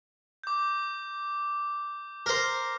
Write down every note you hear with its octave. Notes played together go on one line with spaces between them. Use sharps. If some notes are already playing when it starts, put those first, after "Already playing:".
D6 G6
A#4 C5